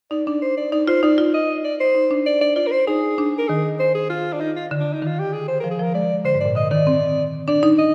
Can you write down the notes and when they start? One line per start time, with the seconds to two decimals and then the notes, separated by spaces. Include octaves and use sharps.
0.11 D#4 D5
0.27 D4 D5
0.42 C5
0.58 D5
0.72 D#4 D5
0.88 F4 C5
1.03 D#4 D5
1.18 F4
1.34 D#5
1.64 D5
1.80 C5
1.95 D#4
2.11 D4
2.26 D5
2.41 D4 D5
2.56 F4 D5
2.67 A#4
2.72 C5
2.87 D#4 G#4
3.18 D4
3.38 A#4
3.48 D#3 G#4
3.80 C5
3.95 G#4
4.10 F4
4.33 D4
4.40 D#4
4.56 F4
4.71 D3
4.80 D4
4.93 D#4
5.02 D#3 F4
5.19 G4
5.33 G#4
5.48 C5
5.60 F3 A#4
5.71 G#4
5.79 F3 A#4
5.94 G#3 D5
6.25 D3 C5
6.35 G#2
6.40 D5
6.45 A#2
6.55 D3 D#5
6.71 D#3 D5
6.87 C4
7.48 D4 D5
7.63 D#4
7.79 D#5